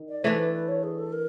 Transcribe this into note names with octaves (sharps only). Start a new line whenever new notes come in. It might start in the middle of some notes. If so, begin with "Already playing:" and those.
Already playing: D#3
D5
E3 A3 D4 C5
B4
B4
C#5
G#4
A4
A#4